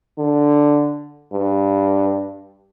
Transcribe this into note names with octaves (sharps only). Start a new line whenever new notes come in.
D3
G2